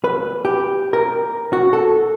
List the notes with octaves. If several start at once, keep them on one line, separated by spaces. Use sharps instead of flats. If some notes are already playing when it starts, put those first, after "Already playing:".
B4
G4
A#4
F#4
A4